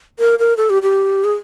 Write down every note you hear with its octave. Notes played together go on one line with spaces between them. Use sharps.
A#4
A#4
A4
G4
G4
G#4